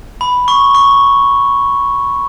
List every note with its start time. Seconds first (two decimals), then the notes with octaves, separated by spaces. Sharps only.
0.21 B5
0.48 C#6
0.75 C#6